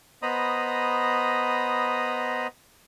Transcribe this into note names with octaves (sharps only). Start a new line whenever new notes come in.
B3 C5 D#5 A#5 B5 D#6